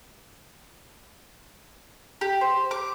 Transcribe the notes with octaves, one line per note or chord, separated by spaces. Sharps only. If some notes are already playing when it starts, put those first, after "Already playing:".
G4
C5
D6